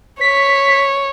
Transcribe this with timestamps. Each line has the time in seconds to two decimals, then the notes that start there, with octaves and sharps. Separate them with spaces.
0.21 C#5 B6